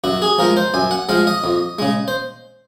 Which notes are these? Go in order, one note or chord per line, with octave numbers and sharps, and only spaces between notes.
F#2 F#4
G#4
F3 G#3 A#4
C5
F#2 G#5
F#5
F3 G#3 F5
D#5
F2
C#3 G#3
C5